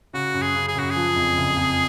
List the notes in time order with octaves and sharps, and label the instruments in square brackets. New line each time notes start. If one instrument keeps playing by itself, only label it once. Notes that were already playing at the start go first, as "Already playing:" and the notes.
[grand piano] C#3 [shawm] F#4
[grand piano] F#2
[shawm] G#4
[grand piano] C#3
[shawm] G#4
[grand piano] F#2 [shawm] F#4
[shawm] G#4
[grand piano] F3
F2
F#1
F2